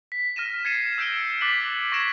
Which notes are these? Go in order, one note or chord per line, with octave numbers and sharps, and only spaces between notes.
B6
F6 A#6 D#7 E7
G#6 A6 C7 C#7 D#7 E7
E6 G6 A#6 D7 E7 G7
D6 F#6 A6 B6 F#7
C#6 G#6 A#6 B6 D7 E7